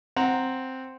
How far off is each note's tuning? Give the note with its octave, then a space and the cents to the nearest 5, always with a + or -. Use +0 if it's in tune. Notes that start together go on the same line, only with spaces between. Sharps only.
C4 +0 F#5 +0 A#5 +0